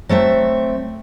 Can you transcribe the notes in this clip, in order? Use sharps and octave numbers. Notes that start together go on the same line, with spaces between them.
F#3 A3 C4 E5